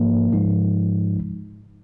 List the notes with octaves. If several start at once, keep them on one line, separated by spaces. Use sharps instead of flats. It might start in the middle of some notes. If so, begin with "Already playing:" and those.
Already playing: G#2 F3 A#3
G#2 F3 G#3 D#4